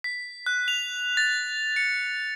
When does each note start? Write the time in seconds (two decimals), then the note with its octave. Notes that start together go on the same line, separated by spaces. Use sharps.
0.04 B6
0.46 F#6
0.68 F7
1.17 A6
1.76 C#7